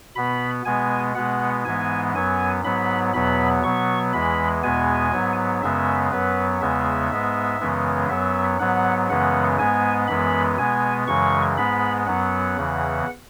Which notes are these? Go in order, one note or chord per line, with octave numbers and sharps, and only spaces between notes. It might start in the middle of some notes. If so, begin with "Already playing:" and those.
B2 B3 B5
B2 G#3 B3 G#5
B2 G#3 B3 F#5
G#2 E3 G#3 B3 G#5
F#2 F#3 B3 G#5
G#2 F#3 B3 B5
E2 B2 F#3 B3 B5
B2 F#3 B3 C#6
E2 E3 G#3 B5
E2 B2 G#3 B3 G#5
G#2 F#3 B3
F#2 C#3 G#3 B3 E5
F#2 F#3 B3 B4
E2 C#3 G#3 B3 E5
G#2 G#3 B3
F#2 C#3 E3 G#3 B3
F#2 F#3 B3 E5
G#2 F#3 B3 F#5
F#2 C#3 E3 G#3 B3 F#5
G#2 G#3 B3 G#5
F#2 E3 G#3 B3 B5
B2 G#3 B3 G#5
F#2 C#3 E3 G#3 C#6
G#2 G#3 B3 B5
F#2 F#3 B3 F#5
E2 C#3 E3